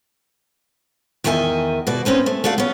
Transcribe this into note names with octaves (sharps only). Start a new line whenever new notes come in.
E2 D#3 A#4 D#5 E5 G#5
B2 F#4 D5
C4 C#4 D#4 B4
A3
A3 F#4 D5 F5
B3 C#4